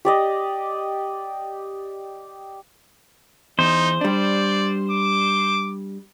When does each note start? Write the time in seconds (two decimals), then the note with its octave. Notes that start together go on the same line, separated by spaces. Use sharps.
0.05 G4 D5 D#5
3.59 E2 D#4 C5
4.01 G3 D4 D5
4.91 D6